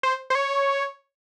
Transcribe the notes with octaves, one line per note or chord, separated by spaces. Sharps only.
C5
C5
C#5